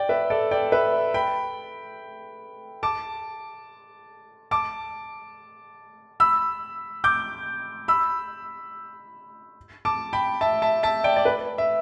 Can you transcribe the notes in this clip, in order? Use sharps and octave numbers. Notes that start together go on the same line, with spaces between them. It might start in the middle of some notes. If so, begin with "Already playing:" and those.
Already playing: D5 G5
B4 E5
A4 D5
D5 G5
B4 E5
G5 B5
A5 D6
A5 D6
B5 E6
D6 G6
B5 E6
A5 D6
G5 B5
E5 A5
E5 A5
E5 A5
D5 G5
D5
B4
E5